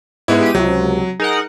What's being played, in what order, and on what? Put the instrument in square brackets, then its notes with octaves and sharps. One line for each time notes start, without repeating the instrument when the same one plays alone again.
[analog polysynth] G#2 [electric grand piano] G#3 B3 E4
[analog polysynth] G4 D#7
[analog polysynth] C#2 C3 [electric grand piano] F#3
[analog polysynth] D#4 A#4 F#5 [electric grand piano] G#4